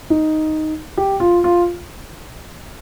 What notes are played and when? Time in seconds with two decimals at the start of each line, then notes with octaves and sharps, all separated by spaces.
0.10 D#4
0.97 G4
1.20 F4
1.44 F4